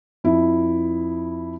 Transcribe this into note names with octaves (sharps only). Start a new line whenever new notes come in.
F2 E4